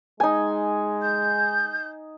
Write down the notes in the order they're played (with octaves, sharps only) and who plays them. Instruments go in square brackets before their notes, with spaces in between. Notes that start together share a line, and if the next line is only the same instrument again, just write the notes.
[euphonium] G#3 [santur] D#4 G#5
[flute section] G6